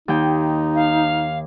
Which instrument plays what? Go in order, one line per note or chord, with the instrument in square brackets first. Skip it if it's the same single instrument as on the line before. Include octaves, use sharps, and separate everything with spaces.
[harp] D#2 G5 [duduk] D#4
[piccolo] F5